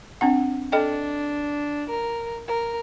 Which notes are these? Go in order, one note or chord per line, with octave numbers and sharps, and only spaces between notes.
C4 D4 F#5
D4 A4 D#5 G5
A#4
A#4